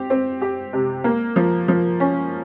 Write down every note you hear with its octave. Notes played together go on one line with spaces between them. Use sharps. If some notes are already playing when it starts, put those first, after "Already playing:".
Already playing: C4 G4
C4
G4
C3
A#3
F3
F3
C#4